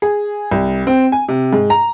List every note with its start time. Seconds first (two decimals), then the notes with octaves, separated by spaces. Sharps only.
0.02 G#4
0.51 C2
0.87 C4
1.12 G#5
1.29 C3
1.53 G#2
1.70 A#5